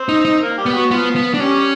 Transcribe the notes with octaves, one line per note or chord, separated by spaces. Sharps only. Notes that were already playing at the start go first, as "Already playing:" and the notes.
Already playing: C4 C5
D#4
D#4
A#3 A#4
G3 G4
B3
F#3 F#4
F3 B3 F4
B3
D4
G3 C#4 G4